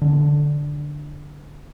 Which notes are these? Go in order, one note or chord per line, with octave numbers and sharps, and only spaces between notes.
D3 D4